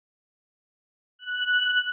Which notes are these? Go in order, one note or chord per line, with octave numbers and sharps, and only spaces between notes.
F#6